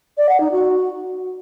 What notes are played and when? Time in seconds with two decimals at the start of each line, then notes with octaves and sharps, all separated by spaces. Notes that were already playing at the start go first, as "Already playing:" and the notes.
0.18 D5
0.29 F#5
0.40 D#4
0.52 F#4